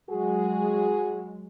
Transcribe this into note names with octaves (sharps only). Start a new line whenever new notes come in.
F#3 G#3 F#4 G#4